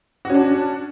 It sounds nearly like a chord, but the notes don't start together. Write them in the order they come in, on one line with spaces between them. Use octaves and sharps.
F#4 C#4 D4